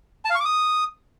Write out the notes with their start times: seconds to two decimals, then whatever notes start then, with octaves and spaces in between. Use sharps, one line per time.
0.25 A5
0.30 F5
0.35 C#6
0.40 D6
0.45 D#6